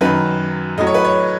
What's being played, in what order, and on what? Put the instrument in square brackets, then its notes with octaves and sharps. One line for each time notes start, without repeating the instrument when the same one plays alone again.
[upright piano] F#2 D#3 F#3 B4
A2 F#3 D#5
C#5
B4
C#5